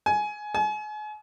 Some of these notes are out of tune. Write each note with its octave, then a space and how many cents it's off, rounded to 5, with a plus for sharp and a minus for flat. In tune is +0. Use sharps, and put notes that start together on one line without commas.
G#5 +15
G#5 +35